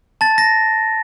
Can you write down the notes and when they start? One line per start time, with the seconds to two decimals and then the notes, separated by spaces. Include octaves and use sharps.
0.21 A5 A6
0.38 A#6